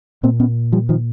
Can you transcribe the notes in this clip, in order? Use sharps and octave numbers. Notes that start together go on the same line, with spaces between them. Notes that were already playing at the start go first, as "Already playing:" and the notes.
A#2 A#3 C4
B3 C#4
F3 G3
D#3 F3